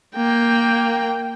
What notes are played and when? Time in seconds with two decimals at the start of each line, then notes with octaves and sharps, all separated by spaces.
0.16 A#3 G5